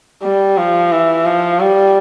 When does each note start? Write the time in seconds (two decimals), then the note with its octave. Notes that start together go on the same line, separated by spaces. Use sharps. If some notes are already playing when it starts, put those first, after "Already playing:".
0.23 G3
0.57 F3
0.92 E3
1.25 F3
1.60 G3